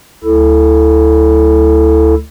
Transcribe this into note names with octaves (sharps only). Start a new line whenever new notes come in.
D2 E4 A4